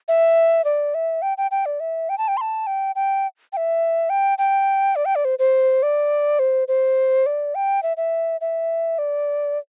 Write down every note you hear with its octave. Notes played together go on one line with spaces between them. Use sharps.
E5
D5
E5
G5
G5
G5
D5
E5
G5
A5
G5
C6
A5
G5
G5
G5
E5
G5
G5
D5
G5
D5
C5
C5
D5
C5
C5
D5
G5
E5
E5
E5
D5